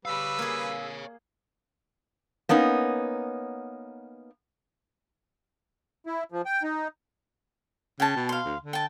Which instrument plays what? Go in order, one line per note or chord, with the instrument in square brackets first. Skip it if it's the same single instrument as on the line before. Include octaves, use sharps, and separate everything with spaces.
[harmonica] G3 B4 [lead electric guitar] C#5 F5 [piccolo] E6
[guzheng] A#3 G#4
[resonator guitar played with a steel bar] A#3 B3 C#4 D#4
[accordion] E4
F3
G5
D#4
[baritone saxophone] C#3 [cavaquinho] G5 A5
[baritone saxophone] B2
[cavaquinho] F5 C6
[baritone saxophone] D2
D3
[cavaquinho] G5 A5